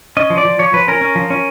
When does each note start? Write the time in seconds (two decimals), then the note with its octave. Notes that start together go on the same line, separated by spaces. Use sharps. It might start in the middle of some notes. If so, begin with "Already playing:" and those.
0.17 C#4 D#5
0.30 F3
0.38 D5
0.45 F3
0.59 F3 C#5
0.73 F3 B4
0.88 C#4 A#4
1.01 C#4
1.15 F3
1.30 C#4